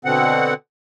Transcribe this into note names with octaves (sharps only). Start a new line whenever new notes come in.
B2 D3 C4 F#5